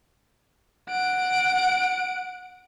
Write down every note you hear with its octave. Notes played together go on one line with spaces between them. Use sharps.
F#5 D7